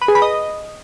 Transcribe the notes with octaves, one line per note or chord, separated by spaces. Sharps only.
B4
G#4
B5
D#5